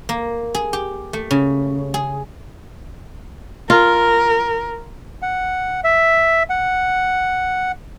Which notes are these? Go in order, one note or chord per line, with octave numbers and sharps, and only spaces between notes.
A#3
G#4
G4
A3
C#3
G#4
F4 A#4
F#5
E5
F#5